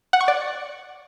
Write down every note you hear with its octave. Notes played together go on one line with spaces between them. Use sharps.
F#5
C#6
D5